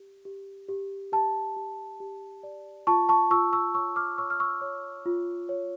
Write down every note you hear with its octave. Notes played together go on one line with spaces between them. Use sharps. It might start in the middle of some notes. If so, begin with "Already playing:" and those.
Already playing: G4
G4
G4
G4 A5
G4
G4
D5
F4 A5 C#6
A5 C#6
F4 C#6 E6
C#6 E6
C#5 C#6 E6
D6 F6
C#5 C#6 E6
F6
C#6 E6
C#5
F4
C#5